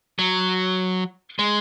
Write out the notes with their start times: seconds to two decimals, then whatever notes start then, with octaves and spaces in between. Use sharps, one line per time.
0.19 F#3
1.39 G#3